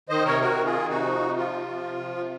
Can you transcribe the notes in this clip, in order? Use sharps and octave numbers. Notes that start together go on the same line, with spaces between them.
D#3 C5 D#5
C3 A#4 C#5
D#3 F#4 A#4
C3
F4 G#4
D#3
C3 D#4 F#4
F3
C3
F3 F4
C3
F3
C3
F3
C3